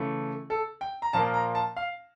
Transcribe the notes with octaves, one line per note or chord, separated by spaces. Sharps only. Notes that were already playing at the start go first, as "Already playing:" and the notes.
Already playing: C#3 E3 A3
A4
G5
A#5
A#2 F3 A#3 A5
A#5
A5
F5